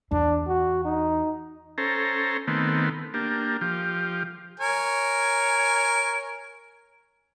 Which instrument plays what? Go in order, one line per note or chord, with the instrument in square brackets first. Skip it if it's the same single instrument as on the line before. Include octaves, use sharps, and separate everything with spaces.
[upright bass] E2 [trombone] D4
[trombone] F#4
D#4
[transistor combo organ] C#4 A4 C5 A#5
D#3 A3 B3 C4
A#3 D4 G4
F3 G4
[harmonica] A#4 C#5 G#5